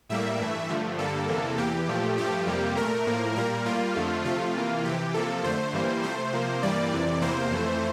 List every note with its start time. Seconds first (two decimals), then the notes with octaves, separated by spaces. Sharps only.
0.09 A2 G3 A#3 E5
0.39 G2 E3 A3
0.69 G2 D3 F3 A3
0.98 G2 D3 G3 A#3 A4
1.28 E2 C3 E3 A#3
1.57 E2 E3 A#3 G4
1.88 A#2 F3 A3
2.17 G2 F3 A3 G4
2.47 F2 C3 G3 A#3
2.76 A#2 A3 A#4
3.06 A2 F3 A#3
3.36 A#2 G3 A#3 A#4
3.65 A2 G3 A#3 F4
3.95 F2 D3 F3 A3
4.25 C3 F3 A3 F4
4.55 C3 E3 A#3
4.84 F2 C3 E3 G4
5.14 C3 F3 A#3 A4
5.43 F2 D3 A3 C5
5.73 G2 E3 G3 A#3
6.03 C3 F3 A3 C5
6.33 C3 F3 A#3
6.63 G2 E3 G3 A#3 D5
6.92 F2 C3 E3
7.21 E2 C3 E3 A#3 C5
7.51 F2 E3 A3